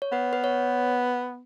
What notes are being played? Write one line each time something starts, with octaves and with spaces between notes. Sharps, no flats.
C#5
B3 B4
B4
C#5